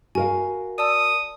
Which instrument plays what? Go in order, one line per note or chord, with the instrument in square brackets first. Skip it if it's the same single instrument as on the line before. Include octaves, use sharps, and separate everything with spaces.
[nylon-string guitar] F#4 A#4 F5 [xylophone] G#5
[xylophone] D5 A5 E6 [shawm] D#6